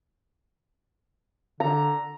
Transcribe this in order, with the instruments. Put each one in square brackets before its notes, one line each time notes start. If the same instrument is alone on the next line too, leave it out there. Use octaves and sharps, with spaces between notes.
[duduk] D3 [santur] A#5